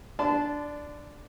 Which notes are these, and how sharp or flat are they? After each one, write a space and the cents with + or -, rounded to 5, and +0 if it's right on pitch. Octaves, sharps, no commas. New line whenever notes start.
D4 +0 A5 -15 C6 -40